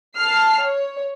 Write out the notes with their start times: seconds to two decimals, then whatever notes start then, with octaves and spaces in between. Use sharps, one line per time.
0.16 A5 F6 C7
0.62 C#5